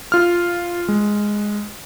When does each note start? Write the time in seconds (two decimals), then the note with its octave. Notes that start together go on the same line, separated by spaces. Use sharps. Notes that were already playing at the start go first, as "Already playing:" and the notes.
0.12 F4 F6
0.88 G#3